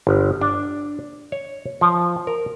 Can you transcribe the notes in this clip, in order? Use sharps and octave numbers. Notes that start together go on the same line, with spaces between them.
G1
D4
C#5
F3
A#4